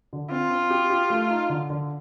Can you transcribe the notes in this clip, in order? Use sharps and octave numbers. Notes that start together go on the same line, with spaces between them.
D3
C4 F4
C4
G4
G4
A3
D#4
D3
D3